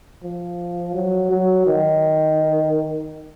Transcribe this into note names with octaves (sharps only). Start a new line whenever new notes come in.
F3
F#3
F#3
D#3